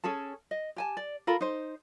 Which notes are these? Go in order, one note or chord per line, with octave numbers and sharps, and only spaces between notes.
C#4 G#4 A4 A5
D#5
G4 G#5 A5
D5
F4 A4 A#4 B5
D#4 C5